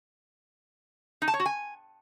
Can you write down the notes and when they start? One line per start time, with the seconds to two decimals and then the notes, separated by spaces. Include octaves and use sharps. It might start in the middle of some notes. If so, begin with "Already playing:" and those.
1.22 D#4
1.28 A5
1.34 C#5
1.40 F#4
1.46 G#5